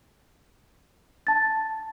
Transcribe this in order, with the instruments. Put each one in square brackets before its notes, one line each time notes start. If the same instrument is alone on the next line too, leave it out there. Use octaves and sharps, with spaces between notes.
[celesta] A5 A6